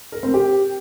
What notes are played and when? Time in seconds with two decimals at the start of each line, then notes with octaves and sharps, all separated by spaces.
0.12 A#4
0.23 C4
0.34 G4